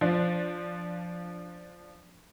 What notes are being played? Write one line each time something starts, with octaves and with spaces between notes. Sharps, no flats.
F3 D4